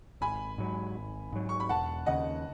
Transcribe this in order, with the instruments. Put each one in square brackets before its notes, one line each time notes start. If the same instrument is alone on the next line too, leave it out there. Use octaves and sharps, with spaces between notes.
[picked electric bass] G#1 [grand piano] G#5 B5
[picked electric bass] G#2 F#3
G#1
G#2 F#3
[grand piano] C#6
B5
[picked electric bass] E1 [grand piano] F#5 A5
[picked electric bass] D#2 C#3 [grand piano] D#5 F#5